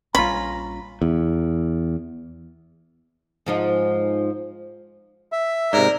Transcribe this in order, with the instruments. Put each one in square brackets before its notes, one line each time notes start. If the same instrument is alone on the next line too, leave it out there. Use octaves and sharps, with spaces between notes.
[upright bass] A#1 G3 [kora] C#4 F4 [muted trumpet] A#5 [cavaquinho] B5
[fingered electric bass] E2
[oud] G#2 F3 D#4
[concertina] E5
[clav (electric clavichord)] G#2 C3 [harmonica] A#4 [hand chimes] D5